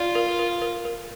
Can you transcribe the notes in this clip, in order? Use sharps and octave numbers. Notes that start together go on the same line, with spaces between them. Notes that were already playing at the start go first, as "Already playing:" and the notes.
Already playing: F4 D5
A#4
A#4
A#4
A#4